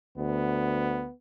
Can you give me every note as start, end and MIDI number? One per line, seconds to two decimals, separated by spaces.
0.18 1.07 38
0.18 1.13 59